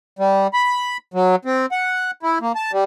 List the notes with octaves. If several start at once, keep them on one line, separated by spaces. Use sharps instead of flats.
G3
B5
F#3
C4
F#5
E4
A#3
A5
G3